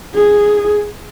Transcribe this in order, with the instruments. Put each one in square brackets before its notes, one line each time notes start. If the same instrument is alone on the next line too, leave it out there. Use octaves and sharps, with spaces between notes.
[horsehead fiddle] G#4